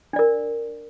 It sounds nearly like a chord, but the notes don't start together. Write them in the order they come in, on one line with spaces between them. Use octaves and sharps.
D4 D5 A#4